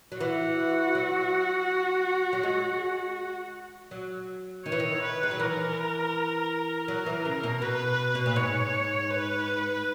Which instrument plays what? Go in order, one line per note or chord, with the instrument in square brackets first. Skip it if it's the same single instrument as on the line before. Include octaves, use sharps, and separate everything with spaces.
[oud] F#3
[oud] E3 [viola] F#4
[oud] F#3
F#3
G#3
F#3
[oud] D#3 [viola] C#5
[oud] E3
D#3
[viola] B4
[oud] G#3
F#3
[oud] E3 [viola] A#4
[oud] F#3 [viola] A#4
[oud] E3
C#3
B2
[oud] B2 [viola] B4
[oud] B2
A#2
[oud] G#2 [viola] C#5
[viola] B4